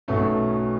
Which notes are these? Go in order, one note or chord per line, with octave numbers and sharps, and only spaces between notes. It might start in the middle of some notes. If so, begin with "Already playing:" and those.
B1 B2 F#3 A3 C#4